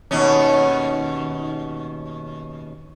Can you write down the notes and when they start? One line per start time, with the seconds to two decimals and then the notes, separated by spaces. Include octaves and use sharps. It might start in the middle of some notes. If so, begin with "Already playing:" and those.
0.11 D#2 B2 C#4